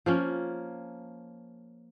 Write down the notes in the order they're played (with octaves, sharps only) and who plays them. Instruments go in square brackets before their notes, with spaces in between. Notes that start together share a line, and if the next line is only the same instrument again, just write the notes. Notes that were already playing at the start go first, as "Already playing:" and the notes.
[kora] F3 A#3 C#4